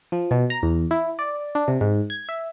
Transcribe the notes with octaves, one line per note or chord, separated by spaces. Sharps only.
F3
B2
A#5
E2
E4
D5
D4
C3
G#2
G#6
E5